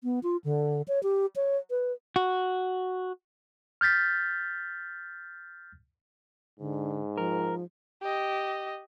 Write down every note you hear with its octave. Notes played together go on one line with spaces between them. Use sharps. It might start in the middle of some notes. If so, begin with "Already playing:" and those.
B3
F4
D3
C#5
G4
C#5
B4
F#4
F6 G6 A6 B6
G#2 D3
F3 A#4
G4 D#5